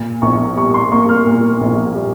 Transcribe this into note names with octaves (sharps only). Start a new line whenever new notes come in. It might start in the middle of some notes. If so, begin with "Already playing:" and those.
Already playing: A#2
A#1 C#6
G3 C#6
C6
A#3 C#6
F6
A#2
A#1
G3